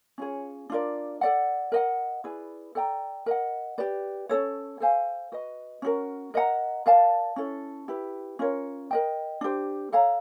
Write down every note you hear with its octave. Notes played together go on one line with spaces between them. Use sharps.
C#4 F4 G#4 C#5
D4 F4 A#4 D5
A4 D5 F#5
A#4 D#5 F#5
E4 G#4 B4 D5
A4 D5 G5 A#5
A#4 D#5 F#5
G4 B4 D5
C#4 F#4 A4 C#5
A4 C5 F5 G#5
F#4 B4 D#5
C#4 F#4 A#4
A#4 D#5 F#5 A#5
A#4 D5 F5 A5
C#4 E4 A4
E4 G4 B4
C#4 F4 A#4 C#5
A#4 D#5 G5
D4 G4 C5
A4 C#5 F5 A#5